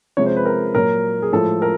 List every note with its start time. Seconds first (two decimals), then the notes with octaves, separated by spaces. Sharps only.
0.17 C3 F3 G#3 C#5
0.26 C5
0.36 B4
0.45 A#4
0.75 A#2 F#3 A#4
1.22 G#4
1.32 A2 F3 G#3 A4
1.62 A#4